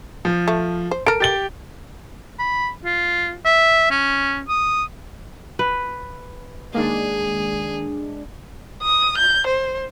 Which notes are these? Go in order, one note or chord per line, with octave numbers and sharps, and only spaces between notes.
F3
A3
C5
A4 A#4 D7
G4 A6 G7
B5
F4
E5
C#4
D#6
B4
D#3 G#3 A#3 D4 G#4
D#6
G6
C5